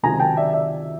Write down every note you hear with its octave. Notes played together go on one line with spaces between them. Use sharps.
C#2 C3 D#3 F#3 G#5 A#5
G5 A5
D5 E5
D5 E5